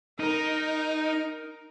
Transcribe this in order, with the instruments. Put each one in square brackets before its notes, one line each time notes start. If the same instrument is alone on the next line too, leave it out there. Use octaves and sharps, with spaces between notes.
[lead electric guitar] D#4 [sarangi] A#4